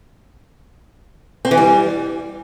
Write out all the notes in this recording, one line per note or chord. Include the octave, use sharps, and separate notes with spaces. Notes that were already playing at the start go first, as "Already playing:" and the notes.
C4
E3
G3